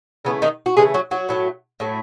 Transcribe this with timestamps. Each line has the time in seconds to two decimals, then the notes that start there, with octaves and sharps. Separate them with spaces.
0.25 C#3 E3 A3 B3
0.42 D#3 D#4
0.66 F#4
0.77 C#3 E3 G#3 A3 G#4
0.94 F#3 F#4
1.11 F#3 F#4
1.29 A2 F#3 A3
1.80 A2 F#3 A3